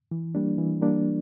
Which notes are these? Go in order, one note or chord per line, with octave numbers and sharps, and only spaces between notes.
E3
G3 A#3 D4
E3
G3 A#3 D4